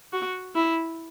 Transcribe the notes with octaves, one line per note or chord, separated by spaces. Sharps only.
F#4
E4